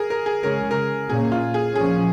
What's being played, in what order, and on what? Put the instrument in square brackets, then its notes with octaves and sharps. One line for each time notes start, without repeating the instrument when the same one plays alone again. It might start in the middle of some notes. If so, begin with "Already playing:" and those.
Already playing: [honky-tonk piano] G#4 A#4
A#4
G#4
[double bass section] C#3 G#3 C#4 [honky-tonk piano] A#4
[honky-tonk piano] A#4
[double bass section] A#2 A#3 C#4 [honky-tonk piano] G#4
[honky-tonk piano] F4
G#4
[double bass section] A#2 F3 C#4 [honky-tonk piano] G#4